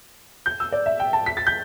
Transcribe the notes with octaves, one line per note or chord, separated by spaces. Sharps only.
G6
E6
D5
E5
G5
A5
B6
A6
G6